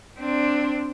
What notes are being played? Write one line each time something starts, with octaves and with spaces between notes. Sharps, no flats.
C4 D4